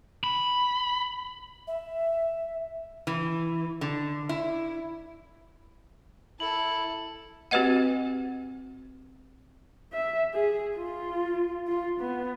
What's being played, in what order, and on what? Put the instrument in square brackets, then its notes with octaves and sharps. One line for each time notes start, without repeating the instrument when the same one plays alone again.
[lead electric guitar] B5
[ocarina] E5
[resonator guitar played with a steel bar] E3
D3
E4
[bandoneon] E4 [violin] A4 [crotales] F#7
[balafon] C4 F#4 G4 B4 D#5 F#5
[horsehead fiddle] E5
G#4
F4
F4
B3